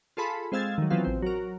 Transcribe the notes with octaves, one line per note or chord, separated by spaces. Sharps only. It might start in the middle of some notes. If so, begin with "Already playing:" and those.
F4 G#4 A4 B5 C6
G#3 C4 F5 E6 G#6 A6
D#3 F#3
E3 F#3 B3 C4 F4
A1 C4
F#3 A#4